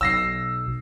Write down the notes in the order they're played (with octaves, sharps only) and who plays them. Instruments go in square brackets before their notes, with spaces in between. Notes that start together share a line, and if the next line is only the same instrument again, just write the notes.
[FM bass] B1 [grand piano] E6 A#6 C7